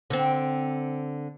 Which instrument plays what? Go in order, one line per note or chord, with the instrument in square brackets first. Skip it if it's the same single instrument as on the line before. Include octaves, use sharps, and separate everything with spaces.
[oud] D3 C4